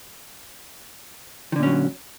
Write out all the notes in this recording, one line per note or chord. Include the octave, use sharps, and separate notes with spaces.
A#2 D3 D#3 F#3 C#4